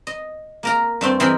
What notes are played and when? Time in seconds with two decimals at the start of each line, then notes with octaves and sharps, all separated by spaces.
0.07 D#5
0.63 A#3 A#4 A#5
1.01 G2 A3 C4
1.20 E3 C4 G#4 A#4 D#5 B5